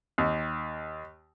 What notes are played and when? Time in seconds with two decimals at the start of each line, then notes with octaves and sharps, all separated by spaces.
0.18 D#2